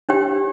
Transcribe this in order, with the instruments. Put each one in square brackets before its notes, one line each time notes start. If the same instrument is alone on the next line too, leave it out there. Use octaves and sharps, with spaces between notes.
[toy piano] D4 G4 C#5 G5